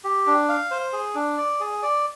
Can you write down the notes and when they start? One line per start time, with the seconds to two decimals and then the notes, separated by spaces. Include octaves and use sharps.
0.04 G4
0.27 D4
0.49 F5
0.71 C5
0.93 G#4
1.15 D4
1.37 D5
1.60 G#4
1.83 D5